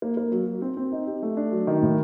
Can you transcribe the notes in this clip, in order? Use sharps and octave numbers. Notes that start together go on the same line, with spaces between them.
A#3
A#3
F#3
F#3
C4
C4
D#4
G4
A3
D4
F#3
D#3
A2